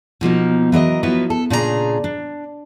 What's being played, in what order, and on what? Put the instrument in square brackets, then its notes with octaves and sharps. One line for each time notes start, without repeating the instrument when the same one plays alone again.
[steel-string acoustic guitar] B2 F3 A#3 D#4
E3 F#3 A#4 D#5
F3 F#3 B3 E4 B4
A4
A#2 C#3 D4 G#4 A#4 A#5
D4